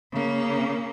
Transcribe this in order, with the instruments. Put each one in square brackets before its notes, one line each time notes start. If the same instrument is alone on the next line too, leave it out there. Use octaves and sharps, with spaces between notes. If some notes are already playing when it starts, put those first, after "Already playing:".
[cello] C#3 A#3